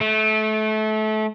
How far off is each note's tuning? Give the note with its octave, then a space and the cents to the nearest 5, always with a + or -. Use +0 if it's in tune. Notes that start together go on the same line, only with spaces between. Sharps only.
A3 -25